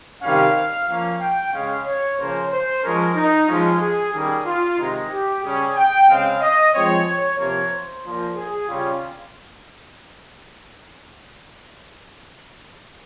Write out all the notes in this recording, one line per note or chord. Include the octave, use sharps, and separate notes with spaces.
C3 D#3 G3 C#4 F5
F3 A#3 C#4 F5
G5
C#3 G#3 C#4 F5
C#5
C#3 F3 A#3 C#4 C5
C5
F3 G#3 C#4 A#4
D#4
F3 G#3 C#4 F4
G#4
D#3 G3 A#3 C#4 G#4
F4
C3 D#3 G#3 D#4
G4
C#3 G3 C#4 G#4
G5
C#3 G#3 C4 F5
D#5
F3 G#3 C4 C#5
C#5
C3 F3 A#3 C#5
C5
A#2 F3 A#3
G#4
C#3 G3 C#4 F4